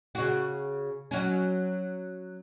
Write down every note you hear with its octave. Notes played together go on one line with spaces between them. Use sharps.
C#3 F#4
F#3 C#4